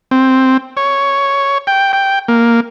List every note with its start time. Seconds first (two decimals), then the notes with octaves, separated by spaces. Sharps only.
0.11 C4
0.77 C#5
1.67 G5
1.93 G5
2.28 A#3